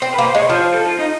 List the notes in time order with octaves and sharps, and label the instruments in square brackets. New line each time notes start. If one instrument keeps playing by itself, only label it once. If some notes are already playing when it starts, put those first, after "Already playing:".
[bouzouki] C4 [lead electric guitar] C5
[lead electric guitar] B4
[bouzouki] A#3
[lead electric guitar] C5
[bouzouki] G#3
[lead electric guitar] C#5
[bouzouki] F3 [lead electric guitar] C5
[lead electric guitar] A4
F4
D#4